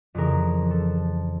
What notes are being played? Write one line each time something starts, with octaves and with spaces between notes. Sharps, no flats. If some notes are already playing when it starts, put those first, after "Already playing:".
F2 C#3 E3 A#4
A4